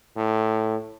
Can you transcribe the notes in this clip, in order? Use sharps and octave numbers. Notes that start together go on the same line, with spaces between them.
A2